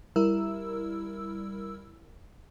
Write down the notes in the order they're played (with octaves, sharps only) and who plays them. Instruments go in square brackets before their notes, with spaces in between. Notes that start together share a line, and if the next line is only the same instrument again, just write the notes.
[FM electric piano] G3 E4 A#4 E6